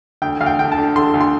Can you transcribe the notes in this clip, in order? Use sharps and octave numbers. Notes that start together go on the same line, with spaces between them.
D2 G5
D2 F5
G5
D3 G5
A5
D3
D3 C6
D2
C6